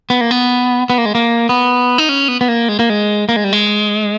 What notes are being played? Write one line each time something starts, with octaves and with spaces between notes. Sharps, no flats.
B3
A#3
B3
B3
A#3
G#3
A#3
B3
D#4
C#4
B3
B3
A#3
G#3
A#3
G#3
A#3
G#3
G3
G#3